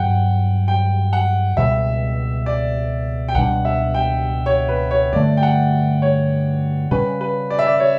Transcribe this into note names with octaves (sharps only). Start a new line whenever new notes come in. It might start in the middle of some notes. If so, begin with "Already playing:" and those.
Already playing: G2 F#3 B3 F#5 G5
G5
F#5
C#2 B2 G3 E5
D5
G5
C#2 B2 G3 D4 F#5
E5
G5
C#5
B4
C#5
G2 D3 A3 D5
G5
F#5
C#5
C#3 G3 C#4 B4
B4
D5
E5
D5
C#5